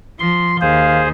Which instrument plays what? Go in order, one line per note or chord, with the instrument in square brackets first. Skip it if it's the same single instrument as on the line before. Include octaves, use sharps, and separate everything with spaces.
[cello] F3 [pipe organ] C6
[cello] D#2 [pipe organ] G#4 C5 [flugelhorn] F5